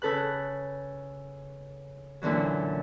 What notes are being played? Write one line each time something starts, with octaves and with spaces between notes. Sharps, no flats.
C#3 A4 B4 F#6
F#2 A#2 D3 E3 F#3